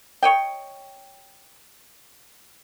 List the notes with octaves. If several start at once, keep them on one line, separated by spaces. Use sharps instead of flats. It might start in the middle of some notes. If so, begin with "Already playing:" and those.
C#5 D#5 G5